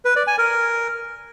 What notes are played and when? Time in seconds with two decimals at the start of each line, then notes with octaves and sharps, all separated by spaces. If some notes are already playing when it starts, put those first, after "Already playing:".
0.05 B4
0.16 D5
0.27 G#5
0.38 A#4